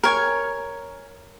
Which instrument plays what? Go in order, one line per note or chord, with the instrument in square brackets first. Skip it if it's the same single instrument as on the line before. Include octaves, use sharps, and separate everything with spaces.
[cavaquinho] A#4 C#5 G#5